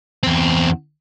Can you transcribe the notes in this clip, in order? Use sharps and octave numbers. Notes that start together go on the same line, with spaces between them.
E2 C4